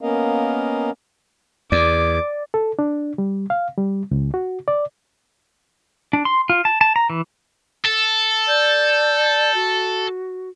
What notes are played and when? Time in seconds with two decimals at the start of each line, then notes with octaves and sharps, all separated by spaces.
0.01 A#3 B3 C#4 A#4 D#5 F5
1.72 E2 D5 D6
2.54 A4
2.79 D4
3.18 G3
3.50 F5
3.78 G3
4.11 C#2
4.34 F#4
4.68 D5
6.13 D4
6.25 C6
6.50 F4
6.65 A5
6.81 A5
6.96 A#5
7.10 E3
7.86 A4
8.48 D5 G6
9.55 F#4